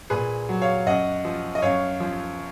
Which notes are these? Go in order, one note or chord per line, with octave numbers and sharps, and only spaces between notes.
A#2 G#4 B4
F#3
C#5 F5
F#2 D#5 F#5
F3
D#5
F#2 C#5 F5
F3